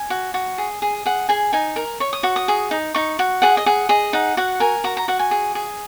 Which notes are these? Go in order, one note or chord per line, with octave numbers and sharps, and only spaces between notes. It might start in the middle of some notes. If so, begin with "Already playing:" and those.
Already playing: G#5
F#4
F#4
G#4
G#4
G#4 F#5
G#4 G#5
D#4 G#5
A#4
C#5 C#6
D#6
F#4 C#6
D#6
G#4
D#4
D#4 C#6
F#4
G#4 F#5
D#5
G#4 F#5
G#4 D#5
D#4 F#5
F#4 F#5
A#4 G#5
F#4 A#5
A#5
F#4 F#5
G#5
G#4
G#4